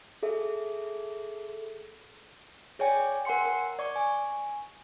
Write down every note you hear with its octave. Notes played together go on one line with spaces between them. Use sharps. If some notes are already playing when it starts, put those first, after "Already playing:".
G#4 A4 E5
G#4 C#5 D5 G5 G#5
A#4 F#5 G#5 C6 C#7
A#4
D5 C#6
G#5